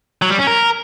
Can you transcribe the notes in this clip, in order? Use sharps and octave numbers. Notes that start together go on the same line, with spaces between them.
F#3
G3
C#4
A#4